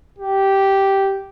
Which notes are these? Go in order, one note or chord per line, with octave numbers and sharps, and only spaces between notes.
G4